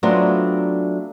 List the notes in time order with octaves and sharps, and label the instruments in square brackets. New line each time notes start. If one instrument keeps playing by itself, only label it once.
[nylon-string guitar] F#3 A3 B3 C4 D4 F4